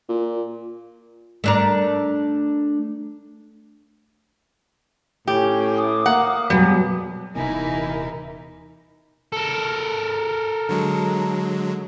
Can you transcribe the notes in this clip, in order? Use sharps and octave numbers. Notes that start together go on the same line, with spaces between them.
A#2
A3 D4 A#4
A2 C#4 G4
D6 D#6
A#3 F#5
B2 F#3 G3 G#4 B4
D#1 C3 E3 B3 D#4 E4 A#4 G#5
A4 A#4
D3 F#3 G#3